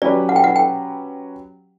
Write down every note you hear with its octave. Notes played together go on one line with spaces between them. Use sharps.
F#3 C#4 G4 B4 D5
F#5
G5
F#5
G5